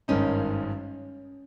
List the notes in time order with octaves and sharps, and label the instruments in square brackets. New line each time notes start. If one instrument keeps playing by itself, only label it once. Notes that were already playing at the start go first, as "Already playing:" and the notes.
[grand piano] G#1 G2 D#3 G#3 D#4 [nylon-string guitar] C#4